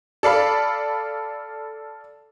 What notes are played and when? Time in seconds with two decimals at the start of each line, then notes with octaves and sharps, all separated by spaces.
0.23 A4 D5 F5 B5